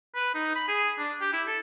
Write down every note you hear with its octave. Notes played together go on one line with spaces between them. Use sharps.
B4
D#4
B5
G#4
D4
G4
E4
A4